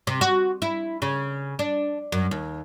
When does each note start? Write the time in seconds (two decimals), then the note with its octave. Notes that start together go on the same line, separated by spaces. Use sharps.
0.07 C3
0.21 F#4
0.62 E4
1.02 C#3
1.59 D4
2.12 F#2
2.31 D#2